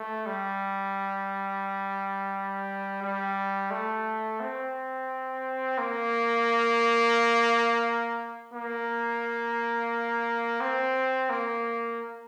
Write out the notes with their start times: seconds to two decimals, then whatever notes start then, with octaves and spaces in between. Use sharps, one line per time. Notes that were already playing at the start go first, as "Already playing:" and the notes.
Already playing: A3
0.26 G3
3.02 G3
3.71 A3
4.40 C4
5.78 A#3
8.54 A#3
10.61 C4
11.30 A#3